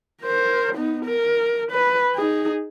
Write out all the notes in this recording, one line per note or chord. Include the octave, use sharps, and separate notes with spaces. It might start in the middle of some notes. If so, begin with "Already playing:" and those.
A#4 C5
B3 D#4
A#4
B4
D#4 G#4